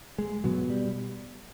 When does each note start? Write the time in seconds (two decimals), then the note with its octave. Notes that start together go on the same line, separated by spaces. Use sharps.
0.18 G#3
0.44 B2 F#3
0.70 G3